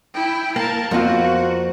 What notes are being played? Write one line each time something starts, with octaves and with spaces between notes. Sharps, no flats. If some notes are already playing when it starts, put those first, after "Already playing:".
E4 G5
A#3 A#4 A5
F2 A#3 B3 F4 F#4 A#4 C5